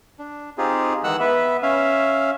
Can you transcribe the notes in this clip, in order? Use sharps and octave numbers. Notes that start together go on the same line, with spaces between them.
D4
C4 D#4 F4 G4 G#4
D#3 E3 G#3 F#5 E6 F#6
B3 B4 E5
C#4 E5 F5